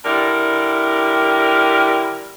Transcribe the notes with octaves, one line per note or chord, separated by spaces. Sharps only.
D3 G3 E4 A#4